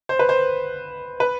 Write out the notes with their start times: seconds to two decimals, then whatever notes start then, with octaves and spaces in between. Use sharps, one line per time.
0.09 C5
0.19 B4
0.29 C5
1.20 B4